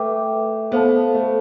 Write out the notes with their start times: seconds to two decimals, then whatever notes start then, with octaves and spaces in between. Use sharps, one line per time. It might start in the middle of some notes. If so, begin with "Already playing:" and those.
Already playing: A3 B4 E5 G5 D6
0.72 B3 A4 C5 F5 A5
1.14 A3